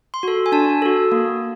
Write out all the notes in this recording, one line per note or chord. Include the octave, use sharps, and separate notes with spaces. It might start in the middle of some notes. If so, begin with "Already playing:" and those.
C6
F#4 A4
G#5
D4 A5
F#4 A4
A#3